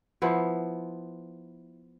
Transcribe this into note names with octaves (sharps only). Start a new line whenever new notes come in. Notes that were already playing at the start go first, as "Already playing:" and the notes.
F3 B3 E4